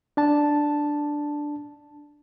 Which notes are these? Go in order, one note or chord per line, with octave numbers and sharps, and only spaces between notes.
D4 A5